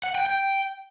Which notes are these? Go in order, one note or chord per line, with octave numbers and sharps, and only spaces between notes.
F#5
G5
G5